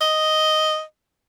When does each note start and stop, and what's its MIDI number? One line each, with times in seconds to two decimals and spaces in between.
0.01 0.82 75